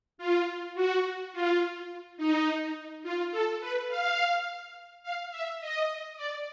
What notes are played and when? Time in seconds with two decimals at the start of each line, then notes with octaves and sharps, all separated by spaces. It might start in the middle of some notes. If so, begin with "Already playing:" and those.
0.18 F4
0.75 F#4
1.33 F4
2.17 D#4
3.03 F4
3.32 A4
3.61 B4
3.89 F5
5.03 F5
5.31 E5
5.61 D#5
6.17 D5